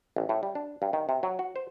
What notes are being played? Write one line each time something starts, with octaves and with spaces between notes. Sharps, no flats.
A1
A2
G3
D4
G2
D#3
C3
F#3
F#4
C5